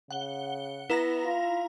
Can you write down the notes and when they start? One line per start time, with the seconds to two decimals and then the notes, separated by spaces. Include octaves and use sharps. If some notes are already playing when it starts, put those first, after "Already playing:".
0.11 C#3 F#5 G7
0.90 B3 E4 A#5 A#6
1.25 F4